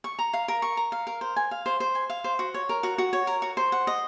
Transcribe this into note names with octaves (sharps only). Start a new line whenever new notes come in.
C#6
A#5
F5
A#4
C#6
A#5
F5
A#4
C5
G#5
F5
C5
C5
G#5
F5
C5
F#4
C#5
A#4
F#4
F#4
C#5
A#4
F#4
C5
F#5
D#5